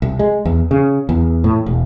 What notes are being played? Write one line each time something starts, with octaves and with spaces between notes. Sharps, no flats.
C2
G#3
E2
C#3
E2
A2
E1